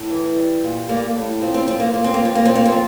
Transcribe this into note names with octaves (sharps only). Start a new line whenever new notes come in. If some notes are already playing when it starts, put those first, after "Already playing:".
Already playing: A2
E3
G3
A#2
G3 A#3
A2
F3 C4
C4
F3 C4
A#3
F3 A#3
C4
A#3
F3
C4
A#3
A#2 C4
A#3
C4
F3